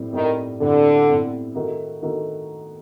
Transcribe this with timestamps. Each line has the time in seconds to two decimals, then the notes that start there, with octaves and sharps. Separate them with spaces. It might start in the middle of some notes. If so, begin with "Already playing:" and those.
Already playing: A2 G3 C4
0.13 A2 D#3 G3 C4
0.60 A2 D3 G3 C4
1.08 A2 G3 C4
1.55 D#3 A3 D#4 F#4 A#4
2.02 D#3 A3 D#4 F#4 A#4